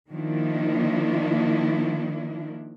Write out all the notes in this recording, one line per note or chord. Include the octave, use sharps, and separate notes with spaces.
D#3 F3 A#3 D4 E4